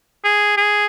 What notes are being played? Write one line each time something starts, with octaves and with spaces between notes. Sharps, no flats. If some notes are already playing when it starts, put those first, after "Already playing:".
G#4
G#4